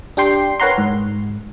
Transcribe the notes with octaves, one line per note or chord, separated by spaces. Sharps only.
D4 G4 G5 C6
A#4 B4 C#5 F#5 A#5 C6
G#2